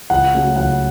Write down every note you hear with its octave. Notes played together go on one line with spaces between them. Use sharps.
C#2 F#5
C#3 F#3 A3
C#2 F#5